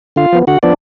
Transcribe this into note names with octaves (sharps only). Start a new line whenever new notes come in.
D3 F4 F5
F3 B3
D3 F#4 F#5
F3 B3 D4 D5